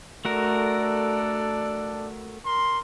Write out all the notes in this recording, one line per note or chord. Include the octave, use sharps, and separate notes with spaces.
A3 D4 F#4 A4 A#4 D5
A#4 C6